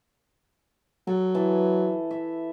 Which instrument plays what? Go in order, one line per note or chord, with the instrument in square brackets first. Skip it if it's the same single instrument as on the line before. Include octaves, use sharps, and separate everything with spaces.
[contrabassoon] F#3 [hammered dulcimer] A4
[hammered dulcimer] E3 A5
E5